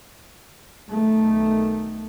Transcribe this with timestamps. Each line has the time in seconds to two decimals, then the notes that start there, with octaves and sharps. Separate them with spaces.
0.90 B1 D#3 A3